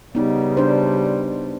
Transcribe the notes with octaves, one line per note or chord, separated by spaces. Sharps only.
C#3 G3 B3 D#4
D4 C5